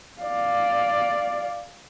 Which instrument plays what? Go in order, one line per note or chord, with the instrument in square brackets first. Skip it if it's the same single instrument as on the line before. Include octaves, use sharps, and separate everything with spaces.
[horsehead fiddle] D5 F5